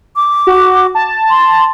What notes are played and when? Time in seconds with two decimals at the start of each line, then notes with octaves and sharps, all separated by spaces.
0.16 D6
0.47 F#4
0.95 A5
1.30 C6